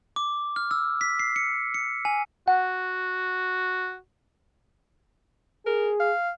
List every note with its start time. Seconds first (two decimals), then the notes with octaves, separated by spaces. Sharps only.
0.16 D6
0.56 F6
0.71 E6
1.01 B6
1.19 C7
1.36 C#7
1.74 C#7
2.05 G#5
2.48 F#4 F#5
5.66 G#4 A#4
6.00 F5